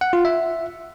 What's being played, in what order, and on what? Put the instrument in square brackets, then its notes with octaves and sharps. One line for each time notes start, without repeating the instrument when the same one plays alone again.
[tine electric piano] F#5
F4
E5